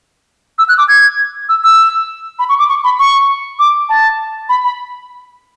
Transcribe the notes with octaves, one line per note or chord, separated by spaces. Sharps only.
E6
F#6
D6
G#6
E6
E6
B5
C#6
D6
C#6
B5
C#6
D6
A5
B5
B5